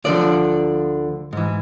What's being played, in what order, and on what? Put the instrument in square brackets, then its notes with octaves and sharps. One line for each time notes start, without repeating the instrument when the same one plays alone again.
[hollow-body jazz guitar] D2 D3 F3 D5
G#2 E3